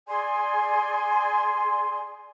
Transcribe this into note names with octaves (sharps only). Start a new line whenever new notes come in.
G#4 D5 G#5 C6